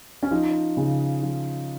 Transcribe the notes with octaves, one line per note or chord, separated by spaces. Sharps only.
C#4
F3 D#4
C#3
F3